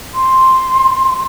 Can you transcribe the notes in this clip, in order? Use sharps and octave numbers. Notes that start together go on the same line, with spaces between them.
C6